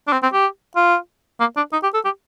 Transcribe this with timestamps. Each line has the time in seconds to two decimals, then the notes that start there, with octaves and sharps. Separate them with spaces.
0.07 D4
0.12 C4
0.23 C4
0.33 G4
0.76 F4
1.40 A#3
1.57 D4
1.72 D#4
1.83 G4
1.94 A4
2.05 G4